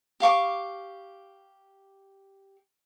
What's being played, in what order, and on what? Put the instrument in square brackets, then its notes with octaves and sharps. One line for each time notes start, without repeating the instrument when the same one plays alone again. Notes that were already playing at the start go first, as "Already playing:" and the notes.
[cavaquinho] G4 F5 C#6 D6